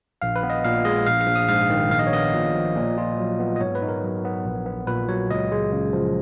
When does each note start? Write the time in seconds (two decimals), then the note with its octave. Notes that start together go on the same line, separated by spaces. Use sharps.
0.22 A#1 F5
0.36 B4
0.43 B3
0.50 D#5
0.64 A#2 F5
0.85 G#3 D#5
1.06 A#1 F5
1.21 F5
1.28 A#1
1.35 D#6
1.49 G#2 F5
1.70 D#3
1.91 A#1 F5
1.99 D#5
2.07 C#5
2.12 B3 D#5
2.33 A#2
2.55 F3
2.76 A#2
2.98 F4
3.18 F#3
3.40 B3
3.56 D#5
3.61 G#2 C#5
3.75 B4
3.82 D#4
3.88 A#4
4.04 F#3
4.25 B3
4.45 A#1
4.66 B3
4.87 A#2 B4
5.09 F#3 C#5
5.30 C#2 D#5
5.52 G#3
5.72 C#3
5.93 F3